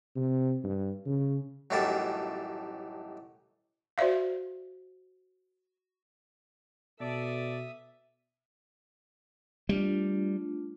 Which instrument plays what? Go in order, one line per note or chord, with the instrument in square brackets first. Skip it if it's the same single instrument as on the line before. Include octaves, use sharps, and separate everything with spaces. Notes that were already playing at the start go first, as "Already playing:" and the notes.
[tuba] C3
G2
C#3
[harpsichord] A1 F#2 A2 D#3 G3 A5
[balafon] F#4 C5 D5 E5 F5
[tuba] B2 [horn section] A4 D5 [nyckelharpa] E5 D#6
[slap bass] G3 [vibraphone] A3 D4 F4